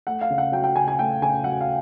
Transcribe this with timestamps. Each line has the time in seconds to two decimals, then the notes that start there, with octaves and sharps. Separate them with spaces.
0.07 A3 F#5
0.21 F5
0.30 C#3
0.38 F#5
0.52 F#3 G5
0.64 G5
0.75 C#3 G#5
0.88 G#5
0.99 A3 G5
1.22 C#3 G#5
1.44 F#3 F#5
1.61 F5